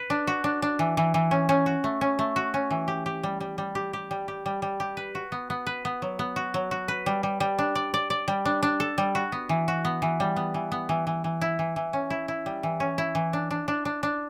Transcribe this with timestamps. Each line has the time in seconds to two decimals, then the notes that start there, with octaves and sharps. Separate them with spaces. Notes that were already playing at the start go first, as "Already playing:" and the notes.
Already playing: B4
0.10 D4
0.27 F#4
0.44 D4
0.62 D4
0.79 E3
0.97 E3
1.14 E3
1.31 C#4
1.49 C#4
1.66 F#4
1.84 A3
2.01 C#4
2.19 A3
2.36 F#4
2.54 C#4
2.70 E3
2.88 G4
3.06 G4
3.23 G3
3.40 G3
3.58 G3
3.75 G4
3.93 G4
4.11 G3
4.28 G4
4.46 G3
4.62 G3
4.80 G4
4.97 B4
5.15 F#4
5.32 B3
5.50 B3
5.67 B4
5.85 B3
6.02 F#3
6.19 B3
6.36 F#4
6.54 F#3
6.71 F#4
6.88 B4
7.06 G3
7.23 G3
7.40 G3
7.58 D4
7.75 D5
7.94 D5
8.10 D5
8.28 G3
8.45 D4
8.63 D4
8.80 A4
8.98 G3
9.15 F#4
9.32 B3
9.49 E3
9.68 F#4
9.85 B3
10.02 E3
10.20 G3
10.36 B3
10.54 E3
10.72 B3
10.89 E3
11.07 E3
11.24 E3
11.41 E4
11.59 E3
11.76 E3
11.93 C#4
12.10 E4
12.28 E4
12.46 G3
12.63 E3
12.80 C#4
12.98 E4
13.15 E3
13.33 D4
13.51 D4
13.68 D4
13.85 D4
14.03 D4